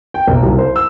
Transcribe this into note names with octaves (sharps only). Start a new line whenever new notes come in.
G5
B1
C2
C5
E6